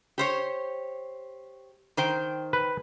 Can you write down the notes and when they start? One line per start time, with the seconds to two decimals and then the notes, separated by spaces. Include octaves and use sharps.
0.18 G4 C5 C#5
1.97 D#3 C5 G5
2.53 B4